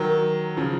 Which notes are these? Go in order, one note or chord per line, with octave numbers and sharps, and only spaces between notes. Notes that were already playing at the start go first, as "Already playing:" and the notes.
Already playing: D#3 F#3
C#3 F3